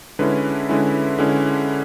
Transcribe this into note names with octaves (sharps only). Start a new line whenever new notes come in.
D3 G#3 C#4 E4 B4
D3 G#3 C#4 E4
D3 G#3 C#4 E4